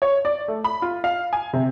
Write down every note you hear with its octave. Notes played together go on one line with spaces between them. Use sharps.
C#5
D5
A3
B5
F4
F5
G#5
C3